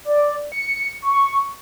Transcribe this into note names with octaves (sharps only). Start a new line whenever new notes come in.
D5
C#7
C#6